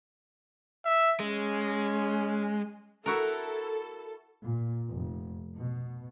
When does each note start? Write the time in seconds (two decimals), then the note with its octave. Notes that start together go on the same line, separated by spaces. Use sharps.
0.85 E5
1.20 G#3 C#4
3.06 E4 F#4 A4 A#4
4.42 A#2
4.90 F1
5.55 B2